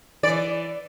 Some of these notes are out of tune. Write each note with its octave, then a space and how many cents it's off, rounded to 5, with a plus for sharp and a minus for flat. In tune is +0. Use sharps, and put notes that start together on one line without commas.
E3 +15 D5 -10